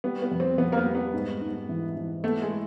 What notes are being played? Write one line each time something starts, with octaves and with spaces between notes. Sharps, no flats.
G3 B3
B3
F2
C4
F2 B3
A#3
B3
G3
B3
G#2
G#2
E3
E3
A3 B3
G#3
E4